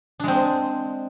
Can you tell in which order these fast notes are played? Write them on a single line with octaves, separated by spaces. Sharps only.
D4 G#3 C4